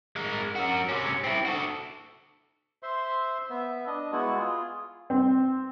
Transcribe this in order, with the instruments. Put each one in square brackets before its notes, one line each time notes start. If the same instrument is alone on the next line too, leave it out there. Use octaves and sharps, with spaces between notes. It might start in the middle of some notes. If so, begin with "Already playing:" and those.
[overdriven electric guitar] G#3 A#4
F#4 A#4
C3 C#4
C4 E4
F#4 A4
[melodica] C5 E5 C6
B3 E5
D4 D#5
G#3 B3 E4 F#4
F4 G#4
[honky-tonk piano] C4